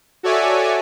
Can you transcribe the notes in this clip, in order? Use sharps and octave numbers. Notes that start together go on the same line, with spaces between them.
F#4 A4 C#5 D5 E5 G#5